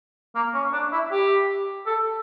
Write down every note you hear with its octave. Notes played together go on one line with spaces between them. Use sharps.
A#3
C#4
D4
E4
G4
A4